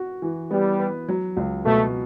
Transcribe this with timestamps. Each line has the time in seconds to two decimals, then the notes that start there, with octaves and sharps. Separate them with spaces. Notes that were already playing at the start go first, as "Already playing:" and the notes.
Already playing: F#4
0.22 E3
0.51 G3 B3
0.79 B4
1.09 F#3
1.37 C#2
1.65 B2 A3